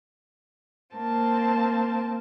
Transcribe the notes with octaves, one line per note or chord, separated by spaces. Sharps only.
A#3 C4 A5